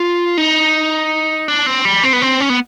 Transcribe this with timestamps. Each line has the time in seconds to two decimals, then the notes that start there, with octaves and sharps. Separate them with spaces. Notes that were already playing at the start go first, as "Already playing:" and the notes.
Already playing: F4
0.38 D#4
1.48 D4
1.66 C4
1.85 G3
2.04 C4
2.13 B3
2.22 C4
2.40 C#4
2.50 B3